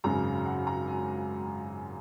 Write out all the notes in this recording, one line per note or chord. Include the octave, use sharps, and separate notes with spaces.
G#1 F#2 C#3 F#3 A#5
F#5
A#5
G#5